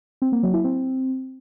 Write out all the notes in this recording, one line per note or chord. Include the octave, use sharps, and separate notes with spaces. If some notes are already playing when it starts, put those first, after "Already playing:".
C4
A#3
F#3
E4
C4